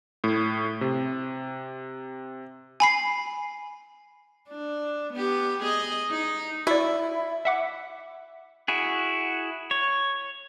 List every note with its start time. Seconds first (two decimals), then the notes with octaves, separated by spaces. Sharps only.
0.24 A2
0.81 C3
2.80 G#5 B5 C7
4.49 D4
5.13 B3 G4
5.63 G#4 D#5
6.11 D#4
6.67 E4 F#4 D5
7.45 E5 F#5 D6
8.68 E4 F#4 G#4
9.71 C#5